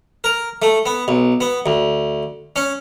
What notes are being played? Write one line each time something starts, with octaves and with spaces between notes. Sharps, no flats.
A#4
A3
B3
B1
B3
D2
C#4